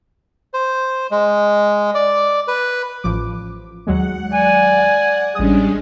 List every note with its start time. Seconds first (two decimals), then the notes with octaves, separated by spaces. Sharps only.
0.54 C5
1.11 G#3
1.95 D5
2.48 B4
3.04 A1 F3 D6
3.87 D#2 F#3 G#3 F#5
4.33 D5 G#5
5.35 A1 G3 G#3 C#4 D4 D#6